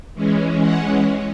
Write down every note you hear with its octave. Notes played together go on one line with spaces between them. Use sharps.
E3 G#3 C#4
F#5